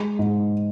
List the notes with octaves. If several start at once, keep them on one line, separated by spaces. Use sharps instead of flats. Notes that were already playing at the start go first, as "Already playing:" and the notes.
Already playing: G#3
G#2